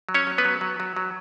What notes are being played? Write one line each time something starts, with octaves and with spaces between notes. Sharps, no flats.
F#3
C#4 C#5
F#3
B3 B4
F#3
F#3
F#3
F#3